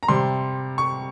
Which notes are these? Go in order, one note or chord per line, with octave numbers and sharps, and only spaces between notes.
A#5
C3 G3 C6
C#6